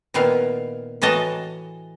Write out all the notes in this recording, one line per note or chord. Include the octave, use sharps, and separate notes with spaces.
A#2 D#3 B3 E4 F5
A2 E3 F#4 D#5 A5 A#5